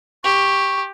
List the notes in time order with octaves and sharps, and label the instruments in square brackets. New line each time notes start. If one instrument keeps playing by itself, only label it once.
[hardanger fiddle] G4 [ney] C#6